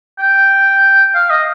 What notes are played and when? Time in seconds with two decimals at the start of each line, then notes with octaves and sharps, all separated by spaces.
0.19 G5
1.15 F5
1.30 D#5